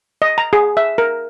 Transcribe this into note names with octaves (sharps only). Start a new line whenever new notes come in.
D#5
A#5
G#4
E5
A#4